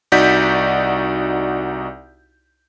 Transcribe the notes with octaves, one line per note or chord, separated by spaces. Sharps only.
C2 D#4 F#4 D5 G6 B6